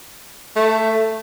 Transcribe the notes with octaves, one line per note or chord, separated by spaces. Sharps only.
A3